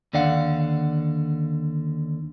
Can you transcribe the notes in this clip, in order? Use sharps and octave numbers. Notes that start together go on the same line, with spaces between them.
D#2 D3 D5 F5 F#5